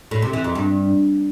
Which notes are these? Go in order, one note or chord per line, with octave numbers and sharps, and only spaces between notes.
A2
C3
E3
F2
G2